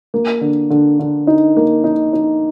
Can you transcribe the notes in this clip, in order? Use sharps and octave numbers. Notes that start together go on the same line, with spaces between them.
A#3
D3
D3
D3
D#4
A#3
D#4
D#4